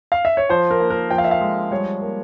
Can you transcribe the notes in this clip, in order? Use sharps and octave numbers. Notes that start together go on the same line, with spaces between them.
F5
E5
C#5
F3 C5
A#4
A#3
A#4
F3 G5
F5
E5
F5
G#3
G3 C#5
A#3